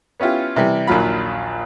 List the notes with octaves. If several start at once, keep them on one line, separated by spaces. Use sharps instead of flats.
B3 C#4 E4 F4 G4
C3 E3 G3
A#1 D#2 F#3 F4 B5